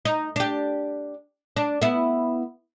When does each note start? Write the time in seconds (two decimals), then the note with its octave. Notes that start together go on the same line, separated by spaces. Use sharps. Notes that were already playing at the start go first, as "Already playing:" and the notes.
0.05 D#4
0.36 D4 G4
1.56 D4
1.82 B3 E4